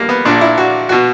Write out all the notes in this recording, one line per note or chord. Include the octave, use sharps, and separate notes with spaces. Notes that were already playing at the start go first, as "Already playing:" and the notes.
Already playing: E2 D3 G3 A#3
B3
A#1 A#2 D4
E4
F#4
B2 F#4